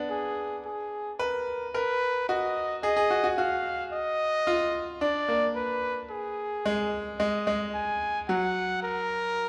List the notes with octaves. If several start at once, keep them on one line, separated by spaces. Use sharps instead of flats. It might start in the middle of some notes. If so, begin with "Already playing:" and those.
Already playing: B3 D4
G#4
G#4
A#4 B4
A#4 B4
F#4 D#5
G#4 D#5
G#4
F#4
F#4
F#4 F5
D#5
F4
D4 D5
A#3
B4
G#4
G#3
G#3 D#5
G#3
G#5
F#3 F#5
A#4